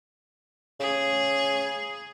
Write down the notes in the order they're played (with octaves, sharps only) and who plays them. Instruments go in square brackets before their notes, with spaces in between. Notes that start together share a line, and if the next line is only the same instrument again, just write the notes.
[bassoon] C#3 [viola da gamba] G#4